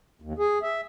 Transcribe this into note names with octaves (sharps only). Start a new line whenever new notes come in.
D#2
G#4
E5